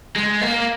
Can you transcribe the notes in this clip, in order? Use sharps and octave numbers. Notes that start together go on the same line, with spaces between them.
G#3
A#3